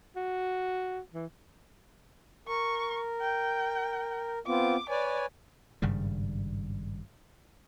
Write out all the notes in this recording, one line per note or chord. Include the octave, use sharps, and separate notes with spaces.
F#4
E3
A#4 C#6
G5
B3 C4 F4 D6
B4 C#5 D5 G#5
G#1 G2 C#3 G3